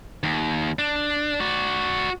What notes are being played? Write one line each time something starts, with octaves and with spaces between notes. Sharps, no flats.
D#2
D4
F#4 D5